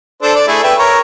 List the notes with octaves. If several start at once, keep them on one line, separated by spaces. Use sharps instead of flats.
D4 A4 C5
D5
A3 E4 G#4
B4 E5 G5
A#4 C#5